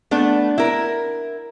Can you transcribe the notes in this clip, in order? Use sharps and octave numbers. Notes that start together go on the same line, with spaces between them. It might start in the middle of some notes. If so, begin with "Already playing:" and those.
A3 B3 D4
E4 A#4